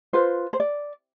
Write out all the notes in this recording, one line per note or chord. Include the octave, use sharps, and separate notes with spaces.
F4 B4 C5
C5
D5